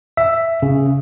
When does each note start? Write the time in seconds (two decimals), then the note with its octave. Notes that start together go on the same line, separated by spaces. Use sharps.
0.17 E5
0.62 C#3